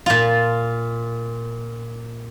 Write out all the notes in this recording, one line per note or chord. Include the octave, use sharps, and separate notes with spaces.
A#2 F4